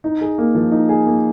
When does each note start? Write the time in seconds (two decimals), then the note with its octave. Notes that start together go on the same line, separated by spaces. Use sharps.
0.04 D#4
0.21 G#4
0.38 A#3
0.55 F3
0.72 D#4
0.89 G#4
1.07 A#3